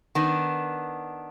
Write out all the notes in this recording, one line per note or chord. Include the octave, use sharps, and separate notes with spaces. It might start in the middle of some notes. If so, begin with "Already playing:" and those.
D#3 B3 D4